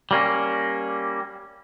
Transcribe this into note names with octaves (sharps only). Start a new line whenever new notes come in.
G3 A#3 C#4